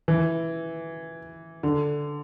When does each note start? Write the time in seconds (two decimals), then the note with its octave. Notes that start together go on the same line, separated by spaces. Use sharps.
0.08 E3
1.63 D3